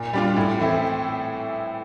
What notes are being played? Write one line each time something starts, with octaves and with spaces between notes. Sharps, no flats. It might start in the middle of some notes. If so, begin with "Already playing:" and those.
Already playing: A#2
G3 D4 F4
A2
E3 A3 C4 E4